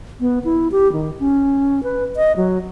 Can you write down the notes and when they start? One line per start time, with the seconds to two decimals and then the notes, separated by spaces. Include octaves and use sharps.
0.20 B3
0.44 E4
0.72 G4
0.93 D#3
1.20 C#4
1.83 B4
2.16 D#5
2.37 F#3